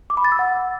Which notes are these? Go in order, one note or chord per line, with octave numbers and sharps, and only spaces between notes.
D6
B5
A6
E6
F#5